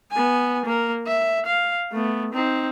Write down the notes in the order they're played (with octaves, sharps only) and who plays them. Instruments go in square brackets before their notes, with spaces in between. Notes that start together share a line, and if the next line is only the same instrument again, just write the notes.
[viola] B3 G#5
A#3 A#4
E5
F5
A3 B3
C4 D#4